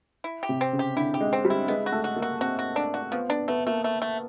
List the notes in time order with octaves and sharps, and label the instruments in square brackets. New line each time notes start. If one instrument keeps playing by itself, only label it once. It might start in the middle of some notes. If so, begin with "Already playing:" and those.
[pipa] E4
G4
[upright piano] C3
[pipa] C4
[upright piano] C#3
[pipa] G4
[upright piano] D3 [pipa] E4
[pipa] G4
[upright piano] G#3
[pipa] C4
[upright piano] G3
[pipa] E4
[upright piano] G#3 [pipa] B3
[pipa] F#4
[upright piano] A3
[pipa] F#4
[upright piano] A#3
[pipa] F#4
[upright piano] C4 [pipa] F#4
[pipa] F#4
D4
F#4
[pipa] F3 [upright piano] B3
[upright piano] B3 [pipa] D4
[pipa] A3 [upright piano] B3
[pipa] A3 [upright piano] A#3
[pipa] A3
A3